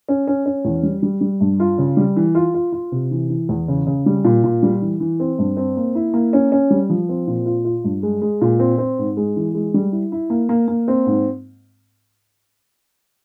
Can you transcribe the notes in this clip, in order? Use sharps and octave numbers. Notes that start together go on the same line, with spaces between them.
C#4
C#4
C#4
E2
G3
G3
G3
G2
F4
C#3
G3
E3
F4
F4
F4
C3
E3
E3
E2
C#3
C#3
G3
A#2
A#2
G3
E3
E3
C4
G2
C4
A#3
E4
A#3
C#4
C#4
G3
F3
C4
A#2
F4
F4
G2
G#3
G#3
A#2
C4
C4
G#2
G#3
E3
G#3
G3
E4
E4
A#3
A#3
A#3
C4
G#2